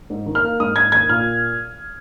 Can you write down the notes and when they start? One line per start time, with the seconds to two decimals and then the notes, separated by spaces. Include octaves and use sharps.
0.10 G#2
0.26 D#3
0.35 F6
0.43 A#3
0.60 G#2 D#6
0.76 G#2 G#6
0.92 D#3 G#6
1.09 A#2 F6